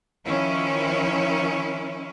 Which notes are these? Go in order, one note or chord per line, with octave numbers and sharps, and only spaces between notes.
D#3 F3 C#4 E4